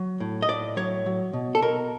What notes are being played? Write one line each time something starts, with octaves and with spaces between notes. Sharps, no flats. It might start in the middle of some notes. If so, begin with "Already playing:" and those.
Already playing: F#3
A2
D#5
A2 D5
F#3 C#5
F#3
B2
A4
B2 A#4